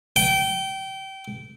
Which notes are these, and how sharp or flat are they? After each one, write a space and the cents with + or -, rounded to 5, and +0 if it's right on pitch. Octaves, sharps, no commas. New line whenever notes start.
G5 -25